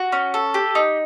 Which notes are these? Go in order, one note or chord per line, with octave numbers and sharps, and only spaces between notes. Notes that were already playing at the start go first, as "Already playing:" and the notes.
Already playing: F#4
C#4
A4
G4
D#4